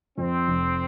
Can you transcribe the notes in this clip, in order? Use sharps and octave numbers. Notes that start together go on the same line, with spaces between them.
F2 C4
F1